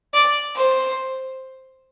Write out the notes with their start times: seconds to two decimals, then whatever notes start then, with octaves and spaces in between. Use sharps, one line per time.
0.14 D5
0.56 C5